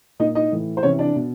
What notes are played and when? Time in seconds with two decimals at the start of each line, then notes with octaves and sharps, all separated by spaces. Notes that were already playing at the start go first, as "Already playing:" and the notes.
0.20 A#2 D#4 D#5
0.35 D#4 D#5
0.52 A2 E3
0.77 C5
0.83 C3 E3 C#4 C#5
0.99 D4 D5
1.16 B2